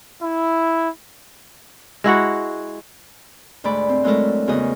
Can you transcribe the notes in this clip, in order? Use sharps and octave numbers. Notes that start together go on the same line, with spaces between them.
E4
G#3 E4 F#4 F#5
D2 G#2 A3 D5 B5
C4
F#3 G#3 A3 E4 A4 A#4
E2 C#3 F#4 D#5